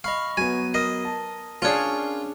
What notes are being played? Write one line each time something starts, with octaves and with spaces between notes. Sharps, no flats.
D#5 F5 B5 C#6
F#3 B3 G#5
A#4 D#5 D#6
A5
C#4 D4 F4 G#4 C#5